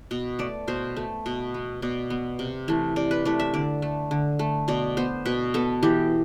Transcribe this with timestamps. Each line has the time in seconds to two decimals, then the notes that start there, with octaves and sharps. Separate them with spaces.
0.11 B2
0.39 A3 D5
0.68 B2 C5
0.96 A3
1.26 B2
1.54 B3
1.82 B2 D5
2.10 B3
2.39 C3
2.68 E3 A3
2.96 C3 D5
3.11 B4
3.25 E3 A3 D5
3.40 E5
3.54 D3 D5
3.82 A3
4.11 D3
4.39 A3
4.68 B2 D5
4.97 B3 C5
5.25 B2 B4
5.54 B3 A4
5.83 E3 G4